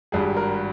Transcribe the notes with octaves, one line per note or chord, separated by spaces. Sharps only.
G#1 G2 G3 G#4
A#4